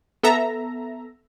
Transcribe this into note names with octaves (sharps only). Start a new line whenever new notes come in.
B3 A4 E5 A#5